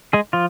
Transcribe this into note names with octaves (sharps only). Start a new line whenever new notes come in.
G#3 G#4
F3 F4